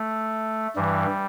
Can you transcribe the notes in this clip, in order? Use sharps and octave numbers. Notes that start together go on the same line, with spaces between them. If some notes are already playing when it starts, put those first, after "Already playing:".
Already playing: A3
G2 E3 G3